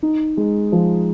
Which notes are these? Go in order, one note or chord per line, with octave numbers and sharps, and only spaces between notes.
D#4
G#3
F3